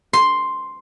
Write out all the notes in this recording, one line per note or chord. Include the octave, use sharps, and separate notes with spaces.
C6